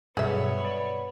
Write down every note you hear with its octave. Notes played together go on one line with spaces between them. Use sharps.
B1 G2 B2 B3 G#4 A4 C#5 E5
D5 B5